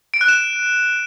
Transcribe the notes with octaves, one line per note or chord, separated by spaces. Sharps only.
D7
F#6
E7